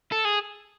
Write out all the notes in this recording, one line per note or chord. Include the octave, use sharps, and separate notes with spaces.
A4
G#4